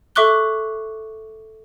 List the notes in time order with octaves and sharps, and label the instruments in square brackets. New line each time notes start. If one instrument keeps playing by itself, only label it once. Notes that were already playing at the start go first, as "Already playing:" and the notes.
[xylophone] A4 E5 C#6 D6 F#6 G7